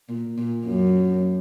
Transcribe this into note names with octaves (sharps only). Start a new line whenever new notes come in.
A#2
A#2
F#2